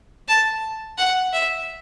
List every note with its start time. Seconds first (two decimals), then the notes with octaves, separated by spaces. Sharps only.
0.28 A5
0.98 F#5
1.33 E5